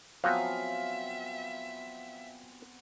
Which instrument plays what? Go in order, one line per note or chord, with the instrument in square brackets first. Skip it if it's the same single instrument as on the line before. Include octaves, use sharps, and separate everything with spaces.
[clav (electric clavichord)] F3 F#3 F#4 [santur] B3 C4 G#5 [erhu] E5 [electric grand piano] F5